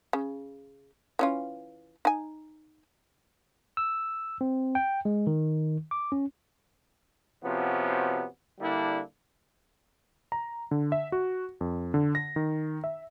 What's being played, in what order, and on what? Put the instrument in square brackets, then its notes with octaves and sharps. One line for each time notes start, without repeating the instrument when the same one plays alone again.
[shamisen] C#3
E3 C#4 F4
D#4 G#5
[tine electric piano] E6
C4
G5
G#3
D#3
D6
C#4
[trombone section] C3 F3 B3 C#4 F#4
D3 G3 A#3 D4 E4
[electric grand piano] A#5
D3
E5
F#4
F2
D3
A#6
D#3
E5